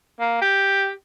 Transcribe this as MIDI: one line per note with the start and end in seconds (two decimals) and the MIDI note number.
0.20 0.41 58
0.42 0.91 67